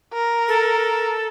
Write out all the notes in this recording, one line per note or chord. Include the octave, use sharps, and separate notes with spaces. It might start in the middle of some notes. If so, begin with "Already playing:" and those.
A#4
A4